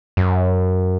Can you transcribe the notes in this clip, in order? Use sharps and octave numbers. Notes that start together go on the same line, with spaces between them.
F#2